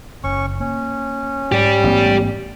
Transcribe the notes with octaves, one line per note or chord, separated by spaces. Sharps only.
F#1 C#4 C#6
A#3 C#4
G#2 G4 D5
A1 B3